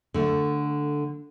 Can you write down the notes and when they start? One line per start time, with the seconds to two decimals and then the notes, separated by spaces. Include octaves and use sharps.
0.14 D3 A3